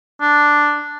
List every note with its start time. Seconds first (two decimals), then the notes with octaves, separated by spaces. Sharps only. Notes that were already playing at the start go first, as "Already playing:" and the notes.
0.21 D4